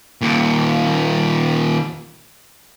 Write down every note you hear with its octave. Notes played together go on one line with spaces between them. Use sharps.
D#2 A#2